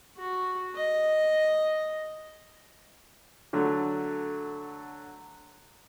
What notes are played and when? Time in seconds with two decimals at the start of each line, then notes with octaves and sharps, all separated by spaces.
0.18 F#4
0.76 D#5
3.53 D3 F#3 A3